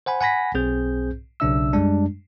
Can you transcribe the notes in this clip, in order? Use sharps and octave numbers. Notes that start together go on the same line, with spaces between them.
C5 F#5 G#5 B5
F#5 G#5 B5 A#6 B6
B1 C4 G#4 C5 G6
B1 C#3 D4 E5 E6
F#2 G3 G#3 D4